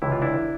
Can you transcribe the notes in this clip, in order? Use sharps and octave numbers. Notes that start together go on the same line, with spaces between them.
C#2 C3 E3 E4
F4
D4 E4